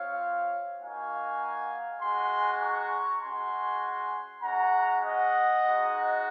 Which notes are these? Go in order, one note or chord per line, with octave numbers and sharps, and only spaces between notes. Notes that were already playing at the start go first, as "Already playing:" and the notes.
Already playing: C4 F4 C#5 F5
A#3 D#4 F#4 F5 G#5
G#3 C#4 F#4 G#5 C6
A#5 C#6
G#3 C#4 F#4 G#5 C6
G#3 C#4 F#4 F#5 A#5
D#5 F#5
G#3 D#4 F#4